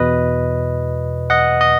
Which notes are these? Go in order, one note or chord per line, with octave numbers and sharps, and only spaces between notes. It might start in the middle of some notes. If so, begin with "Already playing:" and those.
Already playing: E2 B2 B4 D#5
D#5 F#5
D#5